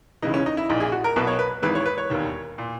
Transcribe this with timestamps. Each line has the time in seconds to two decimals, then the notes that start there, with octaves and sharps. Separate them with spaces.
0.22 C#2 C#3 E3 D#4
0.34 C#4
0.46 D#4
0.57 E4
0.69 A#1 A#2 D#4
0.80 G#4
0.92 F#4
1.04 A#4
1.16 B1 B2 B4
1.27 C#5
1.39 B4
1.62 G#1 G#2 E3 B4
1.75 C#5
1.86 B4
1.98 C#5
2.10 E1 D#2 D#3
2.58 A#2